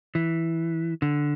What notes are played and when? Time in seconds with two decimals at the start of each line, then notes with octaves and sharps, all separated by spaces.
0.15 E3
1.02 D3